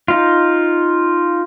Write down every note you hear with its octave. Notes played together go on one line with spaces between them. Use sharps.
D#4 F4